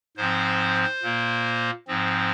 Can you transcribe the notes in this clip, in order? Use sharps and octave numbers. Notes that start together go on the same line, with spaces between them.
G#2 F3 C4 C5
A#2 A#3
G#2 F3 C4